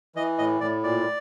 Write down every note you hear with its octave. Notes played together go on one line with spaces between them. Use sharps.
E3 D#5
A2 D#5
A2 D5
A#2 D5